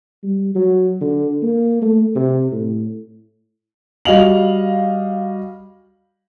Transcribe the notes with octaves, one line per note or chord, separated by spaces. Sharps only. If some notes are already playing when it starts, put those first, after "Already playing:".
G3
F#3
D3
A#3
A3
C3
A2
G3 F#4 D#5 F5 F7 F#7